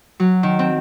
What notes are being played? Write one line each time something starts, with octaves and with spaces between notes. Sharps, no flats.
F#3
D#3
C4